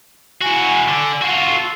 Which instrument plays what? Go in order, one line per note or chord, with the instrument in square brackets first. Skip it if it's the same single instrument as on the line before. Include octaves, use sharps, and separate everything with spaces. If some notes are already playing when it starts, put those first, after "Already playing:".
[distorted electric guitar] E4 F#4 [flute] G#5
[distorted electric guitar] D3
F4 F#4
[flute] A4